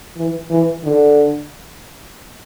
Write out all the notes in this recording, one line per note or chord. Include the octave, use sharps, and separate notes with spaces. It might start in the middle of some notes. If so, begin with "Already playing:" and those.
E3
E3
D3